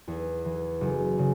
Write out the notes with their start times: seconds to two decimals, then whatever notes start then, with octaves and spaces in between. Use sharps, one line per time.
0.08 E2
0.45 E3
0.81 F#1
1.18 C#3